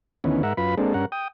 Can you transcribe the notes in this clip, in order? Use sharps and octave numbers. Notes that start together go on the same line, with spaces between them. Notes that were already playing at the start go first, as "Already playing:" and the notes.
D2 D#3 E3 B3 C#4
G#2 A#4 E5 F#5
F#2 F4 B4 B5
G#3 A#3 C4 D4 A4
G2 C#4 A#4 F#5
G5 D#6